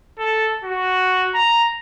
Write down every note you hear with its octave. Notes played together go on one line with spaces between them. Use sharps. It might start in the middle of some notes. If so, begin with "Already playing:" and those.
A4
F#4
A#5